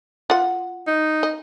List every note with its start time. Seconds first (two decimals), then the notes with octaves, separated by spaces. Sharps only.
0.30 F4 F#5
0.87 D#4
1.23 D#5